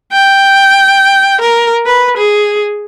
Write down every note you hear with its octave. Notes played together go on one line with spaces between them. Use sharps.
G5
A#4
B4
G#4